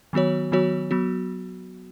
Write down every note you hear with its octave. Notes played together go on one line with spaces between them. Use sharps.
D#3 F#3 B3 F#4 C#5
D#3 F#3 B3 F#4 C#5
F#3 B3 F#4